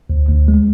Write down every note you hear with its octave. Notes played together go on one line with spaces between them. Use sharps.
D2
D2
G#3